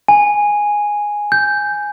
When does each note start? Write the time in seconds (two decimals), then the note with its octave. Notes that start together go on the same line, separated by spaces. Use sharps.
0.08 G#5
1.32 G6